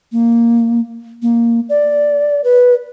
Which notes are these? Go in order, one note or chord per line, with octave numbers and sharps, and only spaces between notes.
A#3
A#3
D5
B4